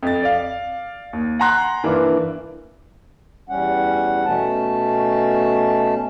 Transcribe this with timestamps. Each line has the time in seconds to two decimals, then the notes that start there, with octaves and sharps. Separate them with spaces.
0.03 F2 A6
0.23 D5 F5
1.13 D#2
1.40 F#5 G#5 A#5 C6 F#6
1.83 G2 E3 A#3 D4 E4
3.49 E2 G3 C#4 F#5
4.25 B2 A3 C#4 A5